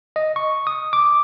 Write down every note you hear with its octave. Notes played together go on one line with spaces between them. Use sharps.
D#5
C#6
D#6
D6